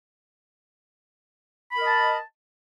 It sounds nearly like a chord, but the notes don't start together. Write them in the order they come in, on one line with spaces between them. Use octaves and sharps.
B5 A#4 D#5 A5